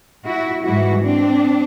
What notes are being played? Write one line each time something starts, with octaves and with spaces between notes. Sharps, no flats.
E4 F#4
G#2 E3 G3 E4 F#4
C4 D4